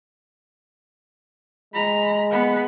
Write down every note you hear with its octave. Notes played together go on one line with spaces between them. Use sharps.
G#3 A#5 B5
B3 B5